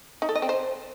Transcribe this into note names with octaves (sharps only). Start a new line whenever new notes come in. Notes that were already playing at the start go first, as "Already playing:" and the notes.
D#4
A4
D#5
C4
C5